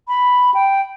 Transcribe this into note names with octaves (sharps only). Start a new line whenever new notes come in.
B5
G5